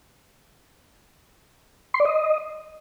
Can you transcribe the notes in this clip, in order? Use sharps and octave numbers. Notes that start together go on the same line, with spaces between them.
C6
D5
D#5